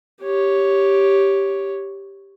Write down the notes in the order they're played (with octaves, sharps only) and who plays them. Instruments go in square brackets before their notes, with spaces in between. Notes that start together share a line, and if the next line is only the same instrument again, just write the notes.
[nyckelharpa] G4 C#5